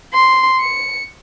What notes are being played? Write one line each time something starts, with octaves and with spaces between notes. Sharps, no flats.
C6
C#7